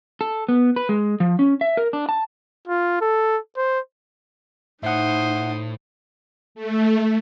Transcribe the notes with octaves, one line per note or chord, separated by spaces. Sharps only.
A4
B3
B4
G#3
F3
C#4
E5
A#4
D4
A5
F4
A4
C5
A2 D#4 C5 E5 F#5 D#6
A3